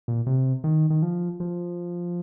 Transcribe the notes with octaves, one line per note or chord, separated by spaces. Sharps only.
A#2
C3
D#3
D#3
F3
F3